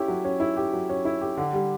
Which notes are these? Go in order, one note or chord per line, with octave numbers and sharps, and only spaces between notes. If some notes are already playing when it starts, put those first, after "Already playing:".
Already playing: C#4 E4 G4
F#3
C#4
E4
G4
F#3
C#4
E4
G4
D3
G3